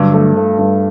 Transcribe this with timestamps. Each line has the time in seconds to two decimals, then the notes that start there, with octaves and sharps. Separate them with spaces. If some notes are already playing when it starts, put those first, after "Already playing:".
Already playing: G2 D3 F#3
0.14 A3
0.37 A3
0.58 G2